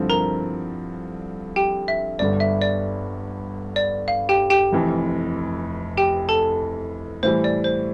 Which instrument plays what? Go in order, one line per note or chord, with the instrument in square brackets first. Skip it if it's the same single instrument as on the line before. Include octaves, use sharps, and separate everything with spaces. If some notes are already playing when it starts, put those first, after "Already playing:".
Already playing: [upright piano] G2 D3 F3 C4 E4
[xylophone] A#4 A#5
G4 G5
E5
[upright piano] G1 G2 D3 [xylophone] D5
[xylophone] E5
D5
D5
F5
G4 G5
G4 G5
[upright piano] F1 F2 E3
[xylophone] G4 G5
A4 A5
[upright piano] A2 E3 G3 [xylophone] C5
[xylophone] D5
C5